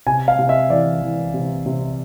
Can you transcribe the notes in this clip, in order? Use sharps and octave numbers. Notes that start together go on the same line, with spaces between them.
C3 G#5
F5
C3
E5
E3 D5
E3
C3
C3